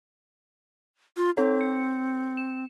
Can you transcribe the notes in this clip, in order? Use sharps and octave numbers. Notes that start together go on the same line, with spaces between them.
F4
C4 D#4 A4 C#5
C#7
E7